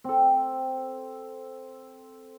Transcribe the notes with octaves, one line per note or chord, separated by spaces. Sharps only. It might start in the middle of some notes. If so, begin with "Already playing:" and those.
C4 A4